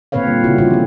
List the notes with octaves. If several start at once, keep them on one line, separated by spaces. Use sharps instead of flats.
A#2 D3 C4 B4 C#5 F5
G3
C#3 G3 E4 F#4
A#2 D3 C4 F4 G4
F3 C#4